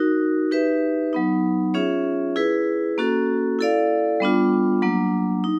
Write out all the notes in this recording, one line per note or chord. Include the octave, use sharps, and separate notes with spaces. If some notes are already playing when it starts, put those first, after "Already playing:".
Already playing: D#4 F#4 A#4
D#4 G4 B4 E5
F#3 B3 D#4
C#4 F4 G#4 C#5 E5
E4 G#4 B4
A#3 C#4 F#4 A4
E4 A4 D5 F5
G3 B3 D4 F4
F#3 A#3 D4
D#4